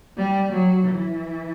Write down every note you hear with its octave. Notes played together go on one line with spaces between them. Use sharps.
G3
F#3
E3